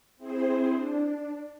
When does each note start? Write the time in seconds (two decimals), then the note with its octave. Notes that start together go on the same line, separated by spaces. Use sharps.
0.17 C4 E4 G#4 C5
0.72 D4